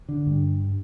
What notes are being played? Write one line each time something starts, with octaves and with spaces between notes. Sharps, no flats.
D3
G2